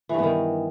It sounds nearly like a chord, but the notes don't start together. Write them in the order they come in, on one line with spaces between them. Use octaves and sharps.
E3 G2 B3 D#3